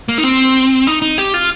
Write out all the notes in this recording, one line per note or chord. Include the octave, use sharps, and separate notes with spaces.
A#3
D#4
C4
D#4
D#4
G4
F4